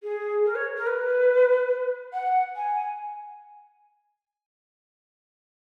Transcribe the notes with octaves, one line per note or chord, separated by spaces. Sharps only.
G#4
A#4
C#5
A#4
B4
F#5
G#5